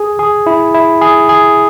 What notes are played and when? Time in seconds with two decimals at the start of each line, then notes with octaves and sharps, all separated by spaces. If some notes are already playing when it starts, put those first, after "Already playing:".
Already playing: G#4
0.19 G#4
0.46 E4
0.74 E4
1.01 G#4
1.29 G#4